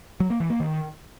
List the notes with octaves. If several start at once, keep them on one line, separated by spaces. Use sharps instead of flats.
F#3
A#3
E3
A#3
D#3